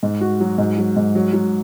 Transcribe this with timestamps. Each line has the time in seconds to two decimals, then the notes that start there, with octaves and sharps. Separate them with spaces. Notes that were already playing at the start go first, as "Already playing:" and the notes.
0.03 G#2
0.21 F#4
0.40 F#3
0.58 G#2
0.78 F#3
0.96 G#2
1.15 F#3
1.33 F#3